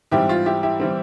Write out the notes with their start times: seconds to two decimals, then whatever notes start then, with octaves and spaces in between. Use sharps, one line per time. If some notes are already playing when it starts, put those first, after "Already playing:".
0.11 G#2 E3 G3 C4 E4 G4
0.29 F4
0.46 E4 G4
0.63 E4 G4
0.80 E3 G3 C4